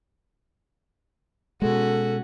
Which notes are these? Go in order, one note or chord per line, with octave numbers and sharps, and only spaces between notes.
B2 G#3 C#4 F#4 A4